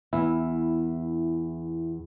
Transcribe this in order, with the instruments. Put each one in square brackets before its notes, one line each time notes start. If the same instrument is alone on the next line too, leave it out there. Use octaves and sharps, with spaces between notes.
[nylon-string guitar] E2 [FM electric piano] E4